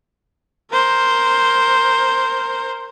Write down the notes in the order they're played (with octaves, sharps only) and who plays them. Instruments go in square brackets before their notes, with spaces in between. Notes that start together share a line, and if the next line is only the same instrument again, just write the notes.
[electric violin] A#4 C5